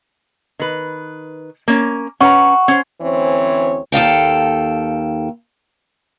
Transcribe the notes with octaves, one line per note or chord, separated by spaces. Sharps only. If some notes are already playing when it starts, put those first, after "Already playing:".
D#3 B4
A#3 C#4
C#4 B4 F#5 A#5 C#6
C#4 C5
D2 E3 C4 C#4 C5 C#5
D#2 A4 F5 G5